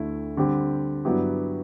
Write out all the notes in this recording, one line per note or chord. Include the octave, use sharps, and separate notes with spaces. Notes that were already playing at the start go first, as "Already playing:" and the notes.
Already playing: D2 D3 A3 E4
D3 G3 C4 G4
G2 F#3 B3 E4 G4